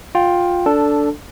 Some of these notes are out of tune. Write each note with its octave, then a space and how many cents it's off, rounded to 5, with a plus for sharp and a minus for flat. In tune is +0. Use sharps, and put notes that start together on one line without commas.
F4 +15 G5 +0
D4 -10 A4 +5